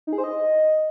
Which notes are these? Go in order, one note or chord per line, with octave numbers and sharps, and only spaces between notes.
D#4
G#4
C5
D#5